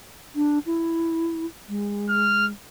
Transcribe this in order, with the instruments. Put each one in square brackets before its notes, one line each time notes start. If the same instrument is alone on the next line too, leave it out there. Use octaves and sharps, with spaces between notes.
[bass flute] D4
E4
G#3
[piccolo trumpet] F6